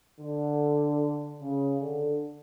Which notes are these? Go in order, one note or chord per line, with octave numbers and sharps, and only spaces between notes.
D3
C#3
D3